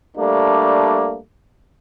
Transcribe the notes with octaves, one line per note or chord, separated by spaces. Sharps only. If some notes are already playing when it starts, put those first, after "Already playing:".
G3 A3 A#3 D4